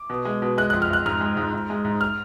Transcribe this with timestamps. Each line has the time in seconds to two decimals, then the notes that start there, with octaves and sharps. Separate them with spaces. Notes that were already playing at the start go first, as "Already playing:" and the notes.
Already playing: D6
0.10 B2
0.25 G#3
0.42 B2
0.58 G#3 F#6
0.70 F2 F#6
0.82 F6
0.90 F2 F#6
1.06 G#2 F6
1.21 G#3
1.37 G#2
1.54 G#2
1.70 G#3
1.85 G#2
2.01 F6